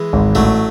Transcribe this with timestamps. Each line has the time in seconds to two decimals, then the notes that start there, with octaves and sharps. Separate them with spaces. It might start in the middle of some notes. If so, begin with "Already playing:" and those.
Already playing: E3 G#3
0.13 G#1
0.35 A1 F#3 A3